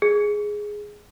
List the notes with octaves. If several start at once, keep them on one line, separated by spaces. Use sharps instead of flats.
G#4